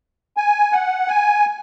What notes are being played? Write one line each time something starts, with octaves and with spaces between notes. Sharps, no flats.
G#5
F#5
G#5